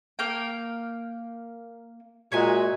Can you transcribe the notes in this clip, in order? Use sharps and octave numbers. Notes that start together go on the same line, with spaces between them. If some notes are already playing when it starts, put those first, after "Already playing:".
A#3 F5 G5
A#2 G#3 F#4 C#5 E5 G#5